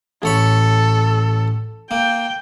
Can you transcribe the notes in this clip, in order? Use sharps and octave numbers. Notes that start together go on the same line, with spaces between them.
A1 A4 C#5 B5
A#3 G5